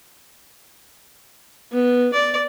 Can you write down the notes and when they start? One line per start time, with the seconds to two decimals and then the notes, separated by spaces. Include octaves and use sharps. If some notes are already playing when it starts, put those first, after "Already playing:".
1.72 B3
2.13 D5